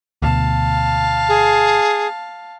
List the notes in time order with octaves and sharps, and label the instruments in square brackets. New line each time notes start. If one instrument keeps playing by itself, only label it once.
[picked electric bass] D2 B2 [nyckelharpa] F5 A5
[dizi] G#4